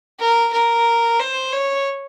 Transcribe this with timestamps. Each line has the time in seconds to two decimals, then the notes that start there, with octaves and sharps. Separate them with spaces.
0.19 A#4
0.53 A#4
1.20 C5
1.52 C#5